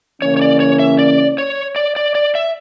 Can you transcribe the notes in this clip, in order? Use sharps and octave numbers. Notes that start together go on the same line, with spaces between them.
C#3 E3 A#3 C#4 C#5
C#5
D5
C#5
E5
D5
C#5
D5
D5
D5
E5